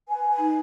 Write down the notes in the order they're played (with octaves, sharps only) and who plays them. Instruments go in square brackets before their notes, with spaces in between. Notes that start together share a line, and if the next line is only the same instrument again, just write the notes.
[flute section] B4 G#5
B4
G#5
D#4